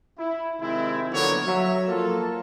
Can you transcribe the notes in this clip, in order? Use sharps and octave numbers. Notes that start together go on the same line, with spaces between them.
E4
C3 D#3 G#3 C4 E4
D3 F3 F#3 A#3 B3 C#5
F#3 E5
F3 A#3 F4 A4